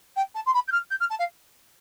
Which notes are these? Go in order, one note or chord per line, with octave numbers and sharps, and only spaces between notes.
G5
A5
C6
B5
G6
F6
G6
F6
A5
F5